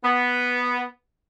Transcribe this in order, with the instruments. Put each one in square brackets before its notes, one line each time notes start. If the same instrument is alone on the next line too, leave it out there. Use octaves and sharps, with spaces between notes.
[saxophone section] B3